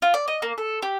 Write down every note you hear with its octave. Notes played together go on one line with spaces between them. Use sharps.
F4
D5
D#5
A#3
A4
G4